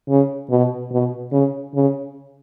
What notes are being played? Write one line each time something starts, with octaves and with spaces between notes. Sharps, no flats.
C#3
B2
B2
C#3
C#3